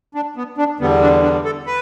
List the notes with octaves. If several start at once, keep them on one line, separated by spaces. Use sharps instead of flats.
D4
B3
D4
E2 D3 G3 B3
D4
D4
A4
B4